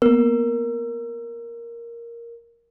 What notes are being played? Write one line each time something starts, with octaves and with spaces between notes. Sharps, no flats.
A#3 B3 A#4